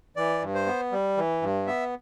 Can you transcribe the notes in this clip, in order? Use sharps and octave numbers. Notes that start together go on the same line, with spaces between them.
E3 D5
G2
C5
B3
G3
E3
G2
B3 E5